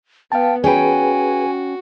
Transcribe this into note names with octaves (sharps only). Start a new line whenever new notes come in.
B3 B4 F5 G5 A5
C#4 F#4 G#4 B4 G5 G#5